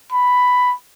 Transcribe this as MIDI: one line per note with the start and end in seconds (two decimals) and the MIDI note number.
0.12 0.74 83